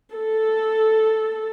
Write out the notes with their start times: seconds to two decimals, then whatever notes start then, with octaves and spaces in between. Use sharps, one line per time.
0.12 A4